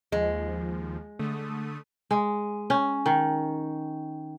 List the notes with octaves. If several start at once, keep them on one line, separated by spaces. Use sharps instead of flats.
D#2 F3 G#3
D3 A3 D#6
G#3
C#4
D#3